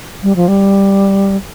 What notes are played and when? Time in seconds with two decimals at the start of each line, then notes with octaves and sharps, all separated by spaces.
0.23 G3
0.36 F3
0.48 G3